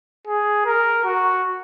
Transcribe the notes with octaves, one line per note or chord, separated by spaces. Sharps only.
G#4
A#4
F#4